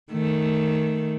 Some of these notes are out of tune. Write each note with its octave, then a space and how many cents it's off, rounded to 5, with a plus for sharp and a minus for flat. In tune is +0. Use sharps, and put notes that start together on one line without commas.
D#3 +0 A3 +0